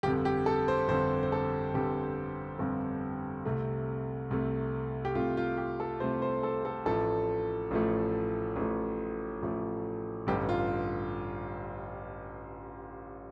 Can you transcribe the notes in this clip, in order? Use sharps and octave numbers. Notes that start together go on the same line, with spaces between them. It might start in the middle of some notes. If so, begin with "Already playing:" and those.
G1 F2 D3 G4
G4
A4
C5
G1 F2 D3 C5
C5
A4
G1 F2 D3 G4
G1 F2 D3
C2 C3 A3
C2 C3 A3
G4
C2 C3 A3 F4
F4
G4
A4
C2 C3 A3 C5
C5
A4
A4
A1 A2 F3 A3 A4
A1 A2 F3 A3
A1 A2 F3 A3
A1 A2 F3 A3
A1 G2 D3 G4
F4